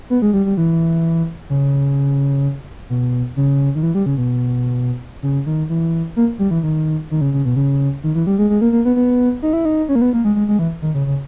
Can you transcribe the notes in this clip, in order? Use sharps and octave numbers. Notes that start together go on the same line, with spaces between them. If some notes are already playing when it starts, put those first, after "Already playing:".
B3
G#3
G3
G3
E3
C#3
B2
C#3
D#3
E3
G3
C#3
B2
C#3
D#3
E3
A#3
G3
E3
D#3
D#3
C#3
C#3
B2
C#3
D#3
E3
G3
G#3
G#3
A#3
A#3
B3
B3
D#4
E4
D#4
C#4
A#3
B3
A#3
G#3
G#3
G#3
E3
D#3
C#3
C#3